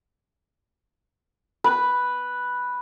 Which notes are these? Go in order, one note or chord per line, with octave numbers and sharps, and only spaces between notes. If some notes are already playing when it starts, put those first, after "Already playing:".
B4